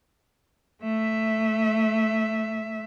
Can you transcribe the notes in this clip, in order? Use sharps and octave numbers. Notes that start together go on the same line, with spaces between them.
A3 E5